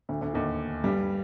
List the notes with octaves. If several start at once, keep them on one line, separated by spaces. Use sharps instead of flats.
D2 D3
D2 D3
D#2 D#3
G2 G3